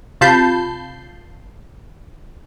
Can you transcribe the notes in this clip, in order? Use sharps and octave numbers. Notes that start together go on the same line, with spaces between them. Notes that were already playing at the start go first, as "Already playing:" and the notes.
C3 F4 A5 B5 G6 C7